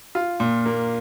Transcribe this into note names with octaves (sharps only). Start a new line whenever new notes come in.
F4
A#2
A#3